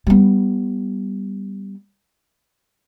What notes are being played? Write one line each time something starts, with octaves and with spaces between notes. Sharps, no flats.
G3 B3